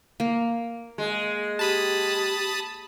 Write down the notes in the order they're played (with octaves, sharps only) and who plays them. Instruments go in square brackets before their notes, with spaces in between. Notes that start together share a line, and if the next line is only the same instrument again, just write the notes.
[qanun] A#3
[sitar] G#3
[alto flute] G4 [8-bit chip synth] A5 B5 D#6